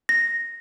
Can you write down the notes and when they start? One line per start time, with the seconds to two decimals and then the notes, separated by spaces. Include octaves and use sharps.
0.09 A#6